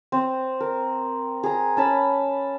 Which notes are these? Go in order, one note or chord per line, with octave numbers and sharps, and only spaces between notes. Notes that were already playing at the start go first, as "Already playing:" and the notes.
C4
A#4
G#4 A#5
C#4 A5 B5